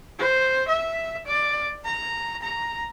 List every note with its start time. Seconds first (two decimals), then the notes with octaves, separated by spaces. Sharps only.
0.19 C5
0.68 E5
1.27 D5
1.84 A#5
2.42 A#5